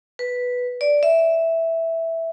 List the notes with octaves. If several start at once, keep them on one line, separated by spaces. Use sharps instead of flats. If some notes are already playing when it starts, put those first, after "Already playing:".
B4
D5
E5